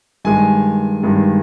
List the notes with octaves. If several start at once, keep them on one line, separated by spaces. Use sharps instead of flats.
G2 D#3 G#3 G#5
G2 D#3 G#3